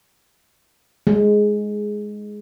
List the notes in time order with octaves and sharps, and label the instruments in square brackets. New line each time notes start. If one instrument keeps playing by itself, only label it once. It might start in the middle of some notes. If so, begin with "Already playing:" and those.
[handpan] G#3